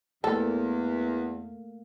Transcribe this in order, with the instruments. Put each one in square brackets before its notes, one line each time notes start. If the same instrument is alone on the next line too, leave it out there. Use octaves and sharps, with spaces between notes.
[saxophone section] E2 [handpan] A3 A#3 [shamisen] A4